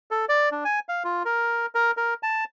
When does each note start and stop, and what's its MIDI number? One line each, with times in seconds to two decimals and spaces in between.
0.11 0.25 69
0.29 0.49 74
0.52 0.64 62
0.65 0.79 80
0.89 1.03 77
1.04 1.23 65
1.25 1.66 70
1.75 1.91 70
1.97 2.14 70
2.23 2.44 81